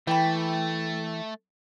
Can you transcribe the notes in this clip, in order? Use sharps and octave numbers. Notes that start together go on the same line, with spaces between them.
E3 A3 G5 B5